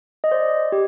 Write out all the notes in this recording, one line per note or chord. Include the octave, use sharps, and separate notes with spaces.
D#5
C5 D5
G4